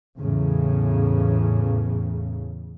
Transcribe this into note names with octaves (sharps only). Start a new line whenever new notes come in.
E2 A2 C#3